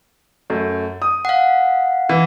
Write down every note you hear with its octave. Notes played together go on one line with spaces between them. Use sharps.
F#2 A3
D#6
F5 F#5
E3